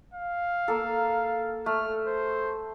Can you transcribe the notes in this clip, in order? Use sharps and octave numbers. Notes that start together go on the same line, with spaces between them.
F5
A#3 A4
A3 F6
C5